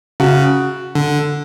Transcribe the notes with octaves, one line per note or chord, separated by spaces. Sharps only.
C#3 F#4 F#5
D3